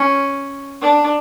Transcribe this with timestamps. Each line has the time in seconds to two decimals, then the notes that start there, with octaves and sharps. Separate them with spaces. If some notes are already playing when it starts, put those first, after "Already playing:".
Already playing: C#4
0.81 D4